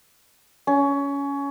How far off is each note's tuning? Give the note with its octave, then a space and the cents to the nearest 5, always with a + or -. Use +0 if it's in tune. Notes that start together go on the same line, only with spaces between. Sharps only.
C#4 +20